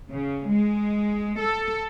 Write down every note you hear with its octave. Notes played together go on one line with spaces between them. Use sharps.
C#3
G#3
A4